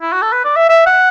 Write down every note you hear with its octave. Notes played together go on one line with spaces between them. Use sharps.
E4
F#4
A4
B4
D5
E5
E5
F#5